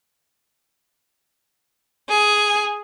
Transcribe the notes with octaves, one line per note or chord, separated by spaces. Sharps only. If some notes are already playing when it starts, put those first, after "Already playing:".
G#4